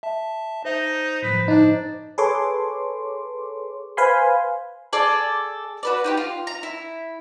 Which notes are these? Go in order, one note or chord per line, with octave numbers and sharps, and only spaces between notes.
E5 A5
D#4 C5
G1 A2 F3 B4
D4 D#4
G#4 A4 B4 C#5 C6 D6
B4 C5 F5 G#5 B5 C6
G#4 A4 D5
F#4 B4 D5
D#4 F4 G4
F4
A#5
E4